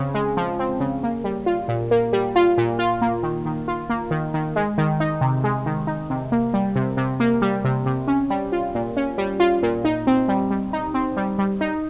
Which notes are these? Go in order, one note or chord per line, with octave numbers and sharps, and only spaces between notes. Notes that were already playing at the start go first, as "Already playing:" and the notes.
Already playing: C#3 C4
G#3
F3
C4
C#3
A#3
G3
F4
A#2
A#3
G3
F4
A#2
F4
A#3
D#3
D#3
F4
A#3
D#3
D#3
G#3
D#3
D#4
C3
G#3
D#3
D#4
C3
A#3
G3
C3
C3
A#3
G3
C3
C3
C#4
G3
F4
A#2
C#4
G3
F4
A#2
D#4
C4
G3
G3
D#4
C4
G3
G3
D#4